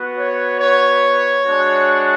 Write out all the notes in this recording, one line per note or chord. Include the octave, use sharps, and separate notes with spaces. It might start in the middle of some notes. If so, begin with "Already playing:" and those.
Already playing: B3 F#4
C#5
C#5
G#3 D4 F#4